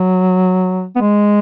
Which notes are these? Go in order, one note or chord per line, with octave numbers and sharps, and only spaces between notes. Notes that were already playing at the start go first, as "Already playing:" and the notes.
Already playing: F#3
B3
G#3